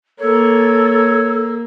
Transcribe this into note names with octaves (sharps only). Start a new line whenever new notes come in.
A#3 A4 C#5